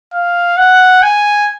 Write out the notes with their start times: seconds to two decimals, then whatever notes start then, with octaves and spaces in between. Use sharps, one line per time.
0.13 F5
0.57 F#5
1.03 G#5